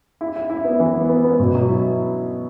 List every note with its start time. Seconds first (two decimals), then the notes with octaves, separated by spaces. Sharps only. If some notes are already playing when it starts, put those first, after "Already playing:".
0.21 E4
0.36 E4
0.50 E4
0.64 B3
0.80 E3
0.95 B3
1.09 B3
1.24 B3
1.40 B2
1.54 F#3
1.69 E4